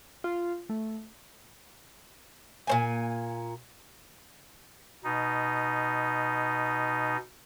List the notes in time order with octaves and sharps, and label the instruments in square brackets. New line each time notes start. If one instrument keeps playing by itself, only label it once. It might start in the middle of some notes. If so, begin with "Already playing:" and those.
[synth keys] F4
A3
[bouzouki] A#2 C4 G#5
[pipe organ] B2 D#4